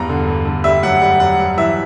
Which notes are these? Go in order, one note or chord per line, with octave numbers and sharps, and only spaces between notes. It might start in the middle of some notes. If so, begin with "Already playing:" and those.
Already playing: E2 G2 A#5
D3
G2
D3
G3 E5
F#2 F#5
G3 F#5
F#2 F#5
G2
E3 E5